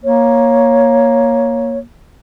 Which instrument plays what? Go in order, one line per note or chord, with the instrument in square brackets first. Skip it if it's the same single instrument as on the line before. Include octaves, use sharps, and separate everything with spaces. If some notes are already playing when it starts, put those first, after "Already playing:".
[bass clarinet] A#3 [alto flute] C#5